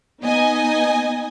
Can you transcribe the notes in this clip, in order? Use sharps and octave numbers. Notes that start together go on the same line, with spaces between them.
B3 D#4 D#5 G#5